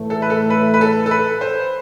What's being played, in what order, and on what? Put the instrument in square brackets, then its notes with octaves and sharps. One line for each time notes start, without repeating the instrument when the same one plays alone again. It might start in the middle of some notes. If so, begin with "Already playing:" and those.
Already playing: [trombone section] A2 E3 A3
[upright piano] A4
B4
A4
B4
B4
A4
A4
B4
C5